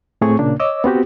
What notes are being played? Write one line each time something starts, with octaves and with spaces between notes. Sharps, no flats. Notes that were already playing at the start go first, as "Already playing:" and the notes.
A2 A3 C4 G#4 C#6
A#2 C#3 A#3 D4
C#5 D#5 D6 E6
B3 C4 F#4 G4